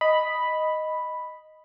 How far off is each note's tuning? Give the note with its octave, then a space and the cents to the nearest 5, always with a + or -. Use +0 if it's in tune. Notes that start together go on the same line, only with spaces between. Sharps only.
D#5 +0 B5 +0